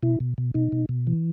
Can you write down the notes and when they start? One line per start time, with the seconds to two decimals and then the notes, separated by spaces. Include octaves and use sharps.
0.03 B2 E4
0.20 B2
0.38 B2
0.54 B2 D#4
0.72 B2
0.89 B2
1.07 E3